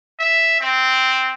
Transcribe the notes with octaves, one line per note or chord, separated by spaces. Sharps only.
E5
C4